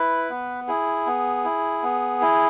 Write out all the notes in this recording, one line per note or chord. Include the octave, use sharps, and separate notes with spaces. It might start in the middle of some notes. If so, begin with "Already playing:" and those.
Already playing: E4 B4
B3
E4 G#4
B3
E4
B3
E4